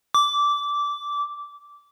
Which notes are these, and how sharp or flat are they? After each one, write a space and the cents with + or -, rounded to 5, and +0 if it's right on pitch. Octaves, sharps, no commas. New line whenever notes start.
D6 -15